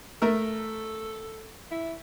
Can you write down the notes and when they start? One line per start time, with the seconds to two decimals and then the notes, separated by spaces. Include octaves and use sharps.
0.22 A3 A4 A#4 E5
1.71 E4